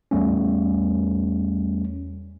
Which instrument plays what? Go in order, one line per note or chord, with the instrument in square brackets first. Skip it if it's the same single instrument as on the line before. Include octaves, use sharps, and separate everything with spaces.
[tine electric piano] E2 G3 A3 C#4